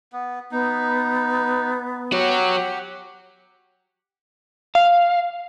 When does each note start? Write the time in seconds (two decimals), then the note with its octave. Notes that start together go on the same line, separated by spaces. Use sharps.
0.13 B3
0.52 B3 D#4
2.12 F#4 G4 C#5 F#5
4.75 F5